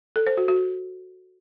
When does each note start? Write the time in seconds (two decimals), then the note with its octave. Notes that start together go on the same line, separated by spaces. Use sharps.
0.16 A4
0.27 C5
0.37 F#4
0.48 F#4